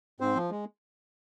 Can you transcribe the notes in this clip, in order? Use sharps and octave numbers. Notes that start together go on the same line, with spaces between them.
G#2 C4 C5
F3
G#3